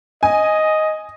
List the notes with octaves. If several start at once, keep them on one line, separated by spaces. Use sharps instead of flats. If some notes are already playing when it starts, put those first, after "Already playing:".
D#5 G#5